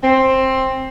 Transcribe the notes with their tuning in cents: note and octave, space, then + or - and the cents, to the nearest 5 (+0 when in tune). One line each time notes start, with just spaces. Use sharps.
C4 +10